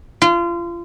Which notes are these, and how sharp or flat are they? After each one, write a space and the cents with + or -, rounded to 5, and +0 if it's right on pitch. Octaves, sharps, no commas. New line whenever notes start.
F4 -30